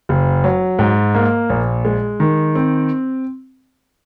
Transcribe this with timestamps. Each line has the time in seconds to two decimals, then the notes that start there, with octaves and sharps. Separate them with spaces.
0.09 F#1
0.44 F#3
0.79 G#2
1.15 A#3
1.50 A#1
1.85 G#3
2.20 D#3
2.55 C4